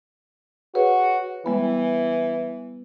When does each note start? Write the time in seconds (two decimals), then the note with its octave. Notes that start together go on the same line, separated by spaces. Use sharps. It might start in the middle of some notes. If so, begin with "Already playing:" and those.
0.75 F#4 G#4 B4 C#5
1.46 E3 G3 G#3 B3